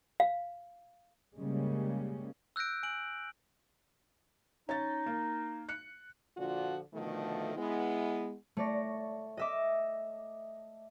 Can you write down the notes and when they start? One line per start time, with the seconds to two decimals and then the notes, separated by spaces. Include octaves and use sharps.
0.20 F5
1.38 C#3 G3 G#3 A#3 C#4
2.56 E6 F#6 G6 A#6 D7
2.83 G#5 D7 F#7
4.69 C#4 D#4 A6
5.06 A#3
5.69 F#6 C#7
6.37 A#2 D3 F3 D4 F4 F#4
6.94 B2 D3 D#3 F3 A3
7.56 G#3 B3 E4
8.57 A3 C#5 D5 A#6
9.37 D#5 E5 D6